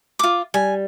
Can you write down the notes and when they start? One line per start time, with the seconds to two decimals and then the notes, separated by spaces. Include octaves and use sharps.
0.19 F4 D6
0.54 G3 G#5